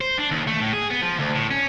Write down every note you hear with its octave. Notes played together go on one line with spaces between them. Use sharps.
C5
D4
D#2
A3
A2
G#4
B3
F3
D2
A2
C#4